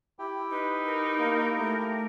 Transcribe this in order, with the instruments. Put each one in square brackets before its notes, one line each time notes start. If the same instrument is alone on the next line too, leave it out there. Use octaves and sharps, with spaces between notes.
[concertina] E4 G4 G5
[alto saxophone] D#4 [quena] B4
[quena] A#4
[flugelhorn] A#3
A3